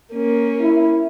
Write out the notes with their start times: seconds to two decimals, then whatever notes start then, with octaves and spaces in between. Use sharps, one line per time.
0.14 A#3 C#4
0.61 E4